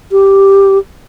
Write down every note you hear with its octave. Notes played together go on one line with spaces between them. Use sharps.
G4